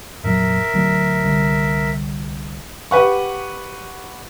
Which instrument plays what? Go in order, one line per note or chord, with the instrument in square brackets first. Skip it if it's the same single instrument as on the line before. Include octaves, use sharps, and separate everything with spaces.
[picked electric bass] F1 A#2 F#3 [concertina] A#4 E5
[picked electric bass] D2 F#3 A3
C2 D3 G3
[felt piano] G4 B4 F#5 C#6